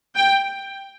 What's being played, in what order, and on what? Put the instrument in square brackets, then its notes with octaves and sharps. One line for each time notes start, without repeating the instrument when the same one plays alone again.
[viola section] G5